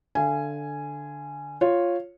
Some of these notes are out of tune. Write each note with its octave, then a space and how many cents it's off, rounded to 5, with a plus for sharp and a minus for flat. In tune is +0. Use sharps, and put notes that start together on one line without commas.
D3 +0 F5 -35 G#5 +0
F4 +0 C#5 -10